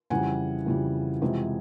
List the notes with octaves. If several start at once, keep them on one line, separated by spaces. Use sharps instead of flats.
F2 C#3 E3 G3 F#5 G#5
F2 C#3 E3 G3
F2 C3 E3 G#3